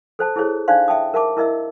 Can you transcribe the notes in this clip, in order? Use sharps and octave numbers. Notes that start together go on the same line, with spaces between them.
A4 C5 A5
E4 G#4 A4 C5 C#5
D4 D#4 C5 D5 F5 C6
E5 G5 A5 D#6
A#4 E5 A5 D6
E4 A#4 D#5 E5 E6